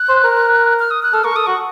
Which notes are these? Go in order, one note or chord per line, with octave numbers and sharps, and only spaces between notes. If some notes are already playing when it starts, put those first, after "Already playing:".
Already playing: F#6
C5
A#4
F6
D#6
F#6
A4 F6
A#4 C#6
A4 D#6
F#4 C#6